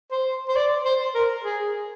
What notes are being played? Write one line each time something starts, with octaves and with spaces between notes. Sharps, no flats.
C5
C5
D5
C5
A#4
G#4